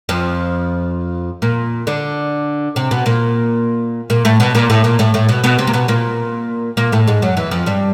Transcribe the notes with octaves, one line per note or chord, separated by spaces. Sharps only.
F2 F3
A#2 A#3
D3 D4
C3 C4
B2 B3
A#2 A#3
A#2 A#3
A2 A3
B2 B3
A#2 A#3
A2 A3
A#2 A#3
A2 A3
A2 A3
B2 B3
B2 B3
C3 C4
A#3
B2 B3
A#2 A#3
A#2 A#3
A2 A3
G#2 G#3
F#2 F#3
E2 E3
F2 F3
G2 G3